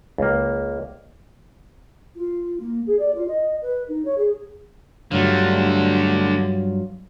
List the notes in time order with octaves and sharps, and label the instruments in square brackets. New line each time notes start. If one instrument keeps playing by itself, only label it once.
[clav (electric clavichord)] C#2 A#3
[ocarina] F4
A#3
G#4
D5
F4
D#5
B4
D#4
C#5
G#4
[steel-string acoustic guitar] G2 F#3 F4 [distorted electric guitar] D3 A3